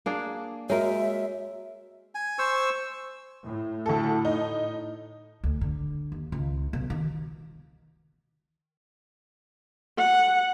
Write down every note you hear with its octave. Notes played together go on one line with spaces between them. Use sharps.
A#3 D4 G#4
G#3 F#4 A#4 C#5 E5
G#5
C5 C#6 E6
A2
D2 A4
D#4
D2
D3
D#2
C#2
B1
D#3
F#5